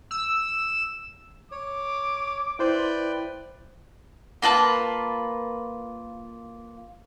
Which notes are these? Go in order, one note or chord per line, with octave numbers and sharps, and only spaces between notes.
E6
C#5 D6
E4 B4 C5 D5 G5
A#3 F4 B4 A5